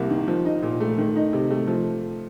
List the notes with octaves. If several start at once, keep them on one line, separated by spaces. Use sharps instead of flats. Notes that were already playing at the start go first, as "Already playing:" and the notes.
Already playing: C2 C3 A#3
D#3
F3
D#4
A#2
A3
D#3
D#4
C3
A3
F3